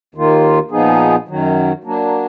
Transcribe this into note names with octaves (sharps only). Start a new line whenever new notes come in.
D#2 D#3 A#3 F4
A#2 F3 B3 D#4 G#4
F#2 D#3 F#3
F#3 A#3 D4